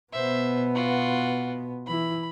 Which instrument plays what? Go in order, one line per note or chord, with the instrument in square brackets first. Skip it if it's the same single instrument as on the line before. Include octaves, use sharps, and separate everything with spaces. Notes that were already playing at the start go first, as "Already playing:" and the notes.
[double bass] B2 B3 [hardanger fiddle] C5 E5
[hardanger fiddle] F4 F#4
[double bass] E3 E4 [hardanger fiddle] B5